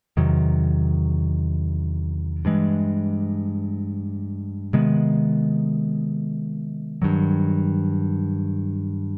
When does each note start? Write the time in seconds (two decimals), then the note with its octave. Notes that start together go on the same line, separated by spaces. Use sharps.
0.17 E2 C3 D#3 F#3
2.45 G2 E3 G#3
4.73 C3 D#3 G#3 B3
7.02 G2 D#3 F#3